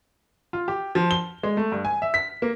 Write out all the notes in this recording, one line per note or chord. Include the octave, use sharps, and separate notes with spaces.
F4
G4
F3
G7
G#3
A3
G2
G#5
E5
B6
A#3